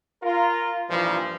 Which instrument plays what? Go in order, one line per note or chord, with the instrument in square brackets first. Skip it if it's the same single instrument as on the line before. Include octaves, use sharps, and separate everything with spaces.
[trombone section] F4 A#4
G2 A#2 E3 F3